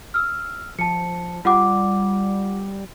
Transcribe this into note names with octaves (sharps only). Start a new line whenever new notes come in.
E6 F6
F3 A5 C#7
G3 F4 F#5 D6